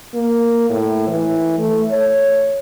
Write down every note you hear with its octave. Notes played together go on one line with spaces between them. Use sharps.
A#3
A2
E3
A3
C#5